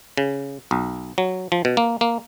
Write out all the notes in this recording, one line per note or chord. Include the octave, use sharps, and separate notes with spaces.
C#3
B1
F#3
F3
B2
A#3
A#3